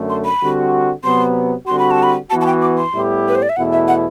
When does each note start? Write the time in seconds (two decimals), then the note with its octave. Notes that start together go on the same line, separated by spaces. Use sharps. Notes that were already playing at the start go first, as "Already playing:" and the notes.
Already playing: F#2 D3 A3
0.09 C6
0.25 B5
0.41 D3 G3 C4 F#4
1.04 C3 F#3 B3 C6
1.67 D3 G3 C4 F#4 C6
1.79 B5
1.91 A5
2.03 B5
2.30 E3 B3 F#4 A5
2.41 A5
2.46 G5
2.62 D6
2.78 C6
2.93 A2 G3 B3 E4 G4
3.28 B4
3.35 C5
3.42 D5
3.49 E5
3.56 E2 B2 A3 E4 F#5
3.72 E5
3.88 F#5